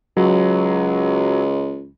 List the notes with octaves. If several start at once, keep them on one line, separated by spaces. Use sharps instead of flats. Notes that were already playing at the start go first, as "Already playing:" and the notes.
C#2 F#3